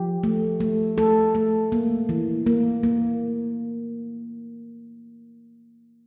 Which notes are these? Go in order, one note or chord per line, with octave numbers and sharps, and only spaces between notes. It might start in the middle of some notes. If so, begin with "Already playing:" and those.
Already playing: F3 G4
A3
A3
A3 A4
A3
A#3
E3
A#3
A#3